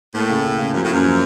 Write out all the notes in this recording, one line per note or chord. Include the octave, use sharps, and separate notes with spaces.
A2 A#3
C#3
C#3
C#3
F#2 F3
A2
F#2 A#3
F3